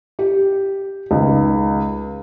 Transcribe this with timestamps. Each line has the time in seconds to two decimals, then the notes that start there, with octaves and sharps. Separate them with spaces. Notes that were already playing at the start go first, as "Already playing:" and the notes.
0.19 G4
1.11 C#2 D#3